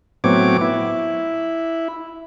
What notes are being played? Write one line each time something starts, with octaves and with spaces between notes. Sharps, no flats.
A2 F#3 B3 C4 C#5 D6
E4